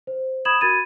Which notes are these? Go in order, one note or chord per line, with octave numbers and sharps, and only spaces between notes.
C5
B5 D#6 G#6 E7 F#7
F#4 A#4 B5 G#6 A6 D#7